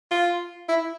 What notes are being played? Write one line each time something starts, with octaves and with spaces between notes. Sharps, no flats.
F4
E4